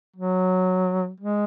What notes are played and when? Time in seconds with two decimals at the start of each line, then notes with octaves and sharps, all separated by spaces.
0.16 F#3
1.20 G#3